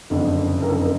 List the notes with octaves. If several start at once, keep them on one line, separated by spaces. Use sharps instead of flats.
F#1 F2 D3
A#4
F#1 F2 D3 A4
A#4